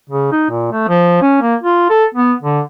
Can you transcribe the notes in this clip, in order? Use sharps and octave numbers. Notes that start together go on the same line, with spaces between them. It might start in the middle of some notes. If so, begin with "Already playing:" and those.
C#3
D#4
A#2
A3
F3
C#4
A#3
F4
A4
B3
D3